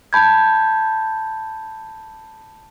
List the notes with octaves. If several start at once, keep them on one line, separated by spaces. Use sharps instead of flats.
A5 B5 G6 G#6